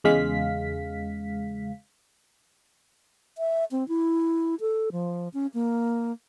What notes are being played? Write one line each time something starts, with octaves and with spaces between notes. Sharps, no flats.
E2 C#3 G#3 F5 B6
E5
C4
E4
A4
F3
C#4
A#3